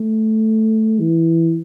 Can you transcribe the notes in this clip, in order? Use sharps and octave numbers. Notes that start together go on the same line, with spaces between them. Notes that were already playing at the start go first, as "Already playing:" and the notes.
Already playing: A3
E3